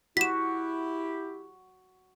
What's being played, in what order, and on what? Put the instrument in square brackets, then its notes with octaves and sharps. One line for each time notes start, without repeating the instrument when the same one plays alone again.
[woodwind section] E4 G4 [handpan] F#4 [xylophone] B6 E7